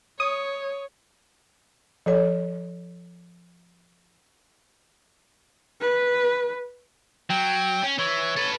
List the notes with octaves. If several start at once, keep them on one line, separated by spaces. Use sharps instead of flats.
C#5 D#6
F3 A4 C#5
B4
F#3 G5
C#4
E3 C#5
A4 B4